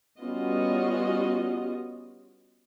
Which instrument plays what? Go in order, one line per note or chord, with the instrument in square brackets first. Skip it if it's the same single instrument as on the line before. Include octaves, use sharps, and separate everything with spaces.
[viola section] G3 B3 C#4 F4 F#4 D#5